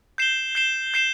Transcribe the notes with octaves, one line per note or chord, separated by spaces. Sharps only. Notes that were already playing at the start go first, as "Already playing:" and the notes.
G6 C7 E7 G7
G6 C7 E7 G7
G6 C7 E7 G7